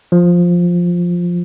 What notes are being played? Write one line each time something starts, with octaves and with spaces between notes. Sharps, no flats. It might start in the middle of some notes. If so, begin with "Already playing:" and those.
F3